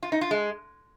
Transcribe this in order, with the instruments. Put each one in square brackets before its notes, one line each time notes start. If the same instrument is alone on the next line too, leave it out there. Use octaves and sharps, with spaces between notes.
[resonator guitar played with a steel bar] F4
D#4
F4
G#3